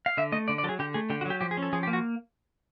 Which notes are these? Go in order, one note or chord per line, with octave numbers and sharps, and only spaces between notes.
F5
D3 E5
A3 D#5
D3 D5
D5
F#3 A4
G#4
D3 G4
A3 G#4
D3 G4
F#4
F#3 G4
F3 G4
G#4
C#4
A4
F3 G#4
G4
A#3
F#4